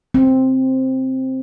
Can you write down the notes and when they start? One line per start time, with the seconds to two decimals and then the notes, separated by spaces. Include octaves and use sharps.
0.14 C4